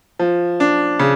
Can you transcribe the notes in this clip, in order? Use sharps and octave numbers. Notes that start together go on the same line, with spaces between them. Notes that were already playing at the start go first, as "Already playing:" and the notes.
F3
D4
C#3